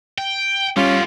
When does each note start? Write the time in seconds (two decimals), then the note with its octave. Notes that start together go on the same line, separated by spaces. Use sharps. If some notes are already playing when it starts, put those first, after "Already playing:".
0.18 G5
0.77 D3 G3 C#4 F4 G4